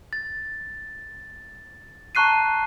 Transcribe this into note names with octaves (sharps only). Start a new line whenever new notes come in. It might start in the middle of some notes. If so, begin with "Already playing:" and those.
A6
A5 A#5 C#6 F#6 C7 D#7